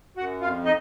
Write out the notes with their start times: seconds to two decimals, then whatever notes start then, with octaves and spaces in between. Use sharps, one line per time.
0.17 F#2 F#4 F#5
0.41 F2 F4 F5
0.65 D#4 D#5